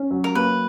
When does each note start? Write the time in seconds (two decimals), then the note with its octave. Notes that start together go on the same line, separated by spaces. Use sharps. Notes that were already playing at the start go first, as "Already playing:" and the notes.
Already playing: C#4
0.11 F#3
0.24 A#4
0.35 A#3 B4